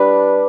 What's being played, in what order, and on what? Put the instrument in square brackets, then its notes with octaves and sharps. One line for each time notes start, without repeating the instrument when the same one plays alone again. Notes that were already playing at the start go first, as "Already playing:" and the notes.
Already playing: [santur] G3 D4 B4